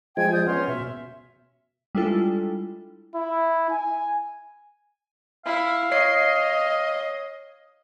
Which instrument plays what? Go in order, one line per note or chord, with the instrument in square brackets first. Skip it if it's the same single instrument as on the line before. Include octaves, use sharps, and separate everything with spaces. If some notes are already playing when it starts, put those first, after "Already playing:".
[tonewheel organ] F3 G#3 [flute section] G5 G#5 G#6
[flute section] D5 D#6 G6
[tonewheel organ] B3 [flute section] C#4 C6 F6
[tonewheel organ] B2 [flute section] E5
[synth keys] G3 G#3 D4 E4 F4 A4
[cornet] E4
G#5
[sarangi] E4 [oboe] F5
[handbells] C#5 C7 [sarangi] D#5